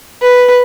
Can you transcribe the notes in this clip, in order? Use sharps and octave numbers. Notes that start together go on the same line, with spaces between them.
B4